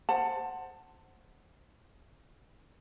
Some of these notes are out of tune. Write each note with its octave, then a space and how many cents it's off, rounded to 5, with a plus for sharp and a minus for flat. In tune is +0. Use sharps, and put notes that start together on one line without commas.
C5 +0 F#5 +5 A5 +20